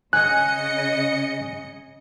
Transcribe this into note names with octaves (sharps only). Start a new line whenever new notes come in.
C#3 D#5 G#5 F#6 C#7